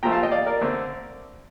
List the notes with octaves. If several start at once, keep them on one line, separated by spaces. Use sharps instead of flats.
A#2 F3 A3 G5 A#5
F5 A5
D#5 G5
D5 F5
A#4 D5
D3 A3 C4